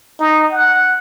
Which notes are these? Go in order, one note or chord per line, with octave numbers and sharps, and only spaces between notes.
D#4
F#5